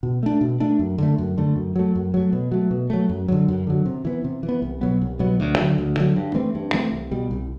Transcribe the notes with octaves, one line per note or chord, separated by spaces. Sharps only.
B2
A3 D4
B2
A3 D4
F#2
D3 A3
F#2
D3 A3
F#2
F#3 A3
F#2
F#3 A3
B2
F#3 A3
B2
F#3 A3
F#2
D3 F#3
F#2
D3 F#3
C3
E3 B3
C3
E3
B3
C2
B2 F#3 B3
C2
B2 F#3 B3
D2
D3 F#3
D2
D3 F#3
G2
E3 A3 C4
G2
E3 A3 C4
C2
B2 G3
C2